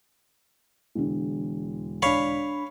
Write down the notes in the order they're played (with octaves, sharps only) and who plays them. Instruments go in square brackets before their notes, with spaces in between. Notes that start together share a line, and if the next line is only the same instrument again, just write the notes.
[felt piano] E1 E2 D3
[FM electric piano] D4 B5 [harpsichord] C#5 F5